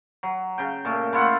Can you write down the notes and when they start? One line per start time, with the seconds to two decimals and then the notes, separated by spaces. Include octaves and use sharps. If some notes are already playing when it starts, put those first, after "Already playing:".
0.23 F#3
0.58 C#3 G5
0.85 A#2 A3
1.13 A3 E4 F4 F#5